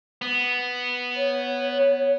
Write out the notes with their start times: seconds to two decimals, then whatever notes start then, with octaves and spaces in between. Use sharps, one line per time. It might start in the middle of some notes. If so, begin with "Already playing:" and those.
0.22 B3
1.16 C#5